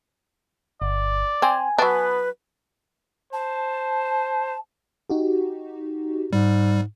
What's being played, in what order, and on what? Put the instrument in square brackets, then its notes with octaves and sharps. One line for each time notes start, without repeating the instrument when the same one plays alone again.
[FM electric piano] G1 [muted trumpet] D5
[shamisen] C4 [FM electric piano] G#5
[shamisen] F#3 D4 [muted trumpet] B3 [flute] B4
[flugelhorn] C5 [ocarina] A5
[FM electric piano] D#4 F#4 G4
[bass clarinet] G#2 [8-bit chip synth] G3